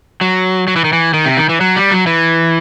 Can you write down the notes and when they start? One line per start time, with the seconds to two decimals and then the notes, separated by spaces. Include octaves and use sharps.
0.21 F#3
0.68 F#3
0.76 E3
0.84 D#3
0.93 E3
1.14 D#3
1.26 C3
1.37 D#3
1.49 E3
1.61 F#3
1.76 G3
1.91 F#3
2.07 E3